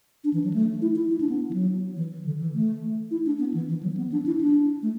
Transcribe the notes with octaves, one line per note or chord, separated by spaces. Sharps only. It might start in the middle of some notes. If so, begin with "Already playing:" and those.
D4
E3
F#3
A3
E4
E4
E4
D4
B3
E3
F#3
E3
E3
D3
E3
A3
E4
D4
B3
E3
E3
F#3
B3
D4
E4
D4
A3